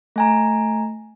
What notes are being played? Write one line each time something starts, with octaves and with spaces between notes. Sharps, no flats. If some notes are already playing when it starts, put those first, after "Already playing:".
A3 G#5 A#5